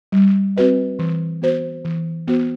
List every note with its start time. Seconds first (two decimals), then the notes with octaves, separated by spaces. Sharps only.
0.12 G3
0.57 C4 F#4 B4 D#5
0.99 E3
1.42 B3 F#4 C5
1.85 E3
2.28 B3 F#4 C5